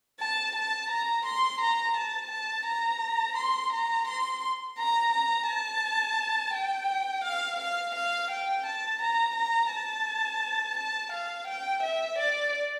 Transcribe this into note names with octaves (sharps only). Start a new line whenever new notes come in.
A5
A5
A#5
C6
A#5
A5
A5
A#5
C6
A#5
C6
A#5
A#5
A5
G5
F5
F5
F5
G5
A5
A#5
A#5
A5
A5
F5
G5
E5
D5